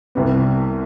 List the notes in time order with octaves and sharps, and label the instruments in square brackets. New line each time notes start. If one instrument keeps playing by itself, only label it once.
[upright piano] C2 C3 G3 B3